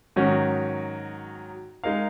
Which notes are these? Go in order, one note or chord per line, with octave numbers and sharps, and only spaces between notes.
G#2 D#3 F#3 C#4 F#4
G#3 D#4 A#4 F5